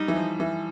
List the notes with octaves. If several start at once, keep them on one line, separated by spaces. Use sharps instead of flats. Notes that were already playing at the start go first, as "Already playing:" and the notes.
Already playing: G3 D#4
E3
F3
E3